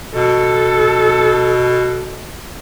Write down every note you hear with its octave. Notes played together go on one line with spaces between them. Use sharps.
B2 A4